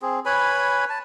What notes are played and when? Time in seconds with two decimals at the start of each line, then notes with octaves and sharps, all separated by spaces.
0.02 C4 G#4
0.25 B4 C#5 G#5 B5
0.90 A5